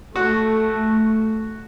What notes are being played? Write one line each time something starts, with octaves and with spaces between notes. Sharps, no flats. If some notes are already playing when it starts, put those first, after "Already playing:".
A3 F#4